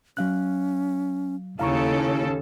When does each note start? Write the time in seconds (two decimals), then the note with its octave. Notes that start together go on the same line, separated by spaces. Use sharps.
0.17 F#3 C#4 F5 F#6
1.59 D#2 C#3 E4 A4 F5 A#5 C#6